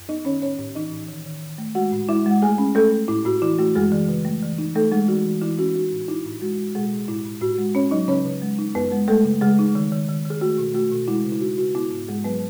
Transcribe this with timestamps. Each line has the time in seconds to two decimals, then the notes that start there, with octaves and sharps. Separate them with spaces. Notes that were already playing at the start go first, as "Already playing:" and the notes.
Already playing: F#2
0.09 B3 D#4 D#5
0.25 D#3 C#4 C#5
0.42 A2 C#4 C#5
0.59 A2
0.75 E3 D#4 D#5
0.92 A2
1.09 D#3
1.26 D#3
1.43 D#3
1.58 A3
1.75 G#3 F#4 F#5
1.92 A2
2.09 G#3 E4 E5
2.26 G#3
2.31 F#5
2.42 A3 G#4 G#5
2.58 C#4
2.75 A3 C#4 A4
2.92 A3
3.08 A2 E4
3.26 A2 F#4
3.42 E3 E4
3.59 A3 F#4
3.75 F#2 G#3 G#4
3.92 E3
4.09 C#3
4.25 A3
4.42 E3
4.58 D#4
4.75 A3 D#4 A4
4.91 G#3 D#4 G#4
5.08 E3 F#4
5.25 E3
5.42 E3 E4
5.58 C#4 F#4
5.75 D#4 F#4
5.92 A2
6.08 D#4 E4
6.25 A2
6.42 G#3 F#4
6.59 G#3
6.75 B2 G#3 G#4
6.92 B2
7.08 A2 E4
7.25 A2
7.41 A2 F#4
7.58 G#3
7.75 C#4 C#5
7.91 F#3 D#4 D#5
8.08 C#3 C#4 C#5
8.25 C#3
8.42 G#3
8.59 D#4
8.75 F#2 B3 B4
8.92 G#3
9.08 G#3 A3 A4
9.24 C#3
9.41 C#3 G#3 G#4
9.59 D#4
9.75 D#3
9.92 D#3
10.09 D#3
10.25 D#3
10.30 G#4
10.41 A3 F#4
10.58 B2
10.74 A3 F#4
10.91 B2
11.08 G#3 E4
11.25 C#3
11.32 E4
11.41 D#4 F#4
11.58 C#3 F#4
11.75 B3 E4
11.91 G#2
12.08 G#2 G#3 G#4
12.24 F#3 B3 B4